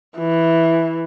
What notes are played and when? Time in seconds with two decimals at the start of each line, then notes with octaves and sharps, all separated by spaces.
0.18 E3